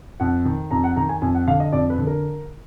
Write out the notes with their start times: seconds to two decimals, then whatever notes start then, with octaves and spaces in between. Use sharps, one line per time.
0.20 F2 F#5
0.45 D#3
0.71 F2 A#5
0.84 F#5
0.96 D#3 A#5
1.09 G#5
1.22 F2 G#5
1.35 F#5
1.47 D3 F5
1.60 D#5
1.72 F2 D5
1.90 B4
1.98 D3
2.07 A#4